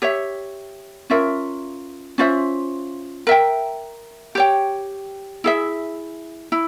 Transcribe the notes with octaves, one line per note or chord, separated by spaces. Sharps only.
G4 C#5 E5
C#4 F4 A#4 E5
C#4 F4 C5 E5
A#4 E5 G5
G4 C#5 G5
E4 G#4 E5
E4